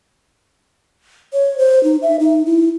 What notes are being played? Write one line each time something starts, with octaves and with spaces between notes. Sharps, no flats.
C#5
C5
D#4
E5
D#4
E4